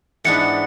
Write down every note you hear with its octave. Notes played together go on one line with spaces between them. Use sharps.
G#2 E3 B3 D4 C#7